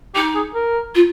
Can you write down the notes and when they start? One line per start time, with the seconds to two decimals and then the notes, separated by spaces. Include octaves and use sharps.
0.15 D#4 G4
0.35 G#4
0.55 A#4
0.95 F4